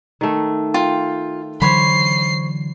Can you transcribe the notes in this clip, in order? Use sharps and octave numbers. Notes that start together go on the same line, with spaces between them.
D#3 A3
F4 G5
D3 E3 F#3 C5 C#5 B5 C7